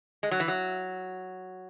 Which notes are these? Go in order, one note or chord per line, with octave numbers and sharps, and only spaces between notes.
G#3
F#3
E3
F#3